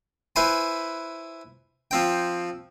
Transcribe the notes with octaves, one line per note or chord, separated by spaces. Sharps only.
E4 B4 C5 G#5
F3 C4 G5